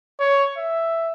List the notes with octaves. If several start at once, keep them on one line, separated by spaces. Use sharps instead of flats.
C#5
E5